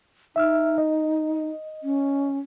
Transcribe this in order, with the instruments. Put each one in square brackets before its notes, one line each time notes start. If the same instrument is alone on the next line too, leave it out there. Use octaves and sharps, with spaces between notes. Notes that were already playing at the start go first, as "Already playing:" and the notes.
[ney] D#4 [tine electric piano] E5 E6 F6
[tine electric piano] D#5
[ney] C#4